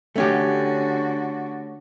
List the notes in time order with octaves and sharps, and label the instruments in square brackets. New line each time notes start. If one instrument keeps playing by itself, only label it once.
[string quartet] D3 F#4 [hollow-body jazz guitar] A3 C#4 G4